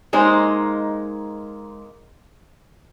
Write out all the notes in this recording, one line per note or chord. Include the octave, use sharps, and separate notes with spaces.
G#3 A#3 D#4 C5